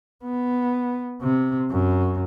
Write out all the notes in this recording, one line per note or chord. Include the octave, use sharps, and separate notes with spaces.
B3
C3
F#2